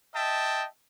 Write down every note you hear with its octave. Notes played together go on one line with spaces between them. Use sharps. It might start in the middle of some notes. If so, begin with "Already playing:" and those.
D#5 E5 G5 A5